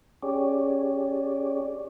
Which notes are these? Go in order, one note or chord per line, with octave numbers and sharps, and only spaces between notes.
C#4 G4 G#4 C#5 D5